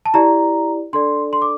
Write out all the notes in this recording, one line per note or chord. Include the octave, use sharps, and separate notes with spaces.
A5
E4 G4 D5 A#5
D4 A4 D5 C6
C6
D6